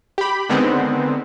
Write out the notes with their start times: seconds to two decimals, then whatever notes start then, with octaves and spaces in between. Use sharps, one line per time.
0.18 G4 B5
0.49 D3 D#3 G#3 B3 C4